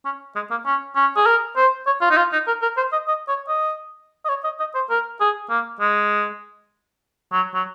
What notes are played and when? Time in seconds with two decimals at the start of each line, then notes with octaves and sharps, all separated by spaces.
0.05 C#4
0.36 G#3
0.51 A#3
0.66 C#4
0.96 C#4
1.17 G#4
1.26 A#4
1.57 C5
1.87 C#5
2.01 F4
2.11 D#4
2.17 F4
2.33 D#4
2.47 A#4
2.62 A#4
2.77 C5
2.93 D#5
3.08 D#5
3.28 C#5
3.48 D#5
4.25 D#5
4.29 C#5
4.44 D#5
4.60 D#5
4.75 C5
4.90 A#4
5.20 G#4
5.50 A#3
5.81 G#3
7.32 F#3
7.54 F#3